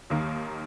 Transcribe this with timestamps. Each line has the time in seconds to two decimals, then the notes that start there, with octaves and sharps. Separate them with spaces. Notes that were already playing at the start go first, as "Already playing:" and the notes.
0.10 D#2 D#3 A#3